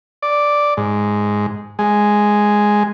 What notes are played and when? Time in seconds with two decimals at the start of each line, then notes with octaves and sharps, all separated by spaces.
0.22 D5
0.77 G#2
1.79 G#3